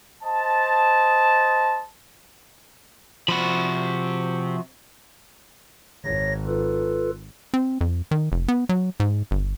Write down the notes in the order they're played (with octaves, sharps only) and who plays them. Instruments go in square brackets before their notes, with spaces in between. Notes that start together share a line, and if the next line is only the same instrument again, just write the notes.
[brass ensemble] C5 D#5 A5
[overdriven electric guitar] C3 B5 [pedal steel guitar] F3 F#4
[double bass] G#1 [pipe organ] C#5 A#6
[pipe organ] F4 A4 B4
[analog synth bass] C4
F2
D#3
F1
B3
F#3
G#2
G1